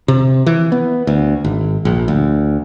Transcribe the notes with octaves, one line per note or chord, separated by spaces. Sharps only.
C3
E3
B3
D2
G#1
A#1
D2